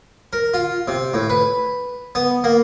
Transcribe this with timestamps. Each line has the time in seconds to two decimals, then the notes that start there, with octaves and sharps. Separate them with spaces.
0.33 A#4
0.54 F4
0.88 C3
1.13 A2
1.30 B4
2.15 B3
2.44 A#3